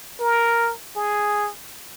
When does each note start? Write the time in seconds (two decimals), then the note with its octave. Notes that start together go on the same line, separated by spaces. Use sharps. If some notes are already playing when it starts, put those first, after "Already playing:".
0.19 A#4
0.96 G#4